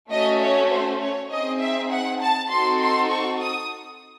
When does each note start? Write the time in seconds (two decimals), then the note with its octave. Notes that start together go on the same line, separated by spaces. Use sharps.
0.10 A3 C#4 F#4 D#5
0.41 C#5
0.70 C5
1.00 C#5
1.30 C4 D#4 G#4 D#5
1.60 E5
1.91 F#5
2.21 A5
2.50 C4 D#4 F#4 A4 C6
2.80 C6
3.10 C#6
3.40 D#6